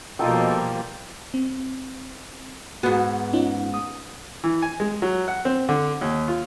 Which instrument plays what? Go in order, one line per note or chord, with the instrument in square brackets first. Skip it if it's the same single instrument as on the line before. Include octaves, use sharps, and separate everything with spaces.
[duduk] B2 [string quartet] F3 G3 A#3 [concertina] D#4 A4 [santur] F4 G5
[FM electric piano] C4
[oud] G#2 B3 [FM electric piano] F#4
[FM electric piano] C#4 D#4 F4
D#6
[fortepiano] E3
G#5
G#3
F#3
F#5
C4
D3
D#2
F4